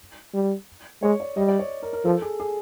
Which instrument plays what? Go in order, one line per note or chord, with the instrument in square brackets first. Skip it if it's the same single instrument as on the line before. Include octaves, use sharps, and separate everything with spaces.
[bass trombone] G3
[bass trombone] G#3 [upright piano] C#5
[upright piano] D5
[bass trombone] G3 [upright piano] D#5
[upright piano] D5
C#5
A#4
A#4
[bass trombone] F3 [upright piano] A4
[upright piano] G#4
G#4